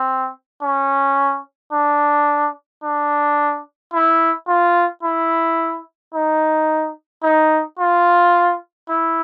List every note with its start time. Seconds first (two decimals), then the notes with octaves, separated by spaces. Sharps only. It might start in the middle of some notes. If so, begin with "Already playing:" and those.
Already playing: C4
0.62 C#4
1.72 D4
2.83 D4
3.93 E4
4.48 F4
5.03 E4
6.14 D#4
7.23 D#4
7.79 F4
8.89 E4